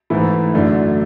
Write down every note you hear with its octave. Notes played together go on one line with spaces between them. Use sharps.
G#2 E3 A3 E4
F#2 D3 A3 D4